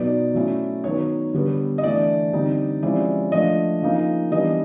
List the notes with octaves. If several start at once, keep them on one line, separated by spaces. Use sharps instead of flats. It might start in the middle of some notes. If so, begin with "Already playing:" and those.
Already playing: B2 F#3 B3 D#4 D5
F#3 A3 C#4 E4
D#3 F#3 B3 C#5
D3 G3 B3
D#5
E3 A3 D4 D5
D3 G3 C4 D#4
C3 F3 G#3 C#4 E4 D5
F3 A3 D4 D#5
C#3 F3 A#3 D#4
E3 G3 B3 D4 D#5